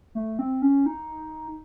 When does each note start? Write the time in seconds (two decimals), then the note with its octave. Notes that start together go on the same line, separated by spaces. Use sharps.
0.15 A3
0.39 C4
0.62 C#4
0.86 D#4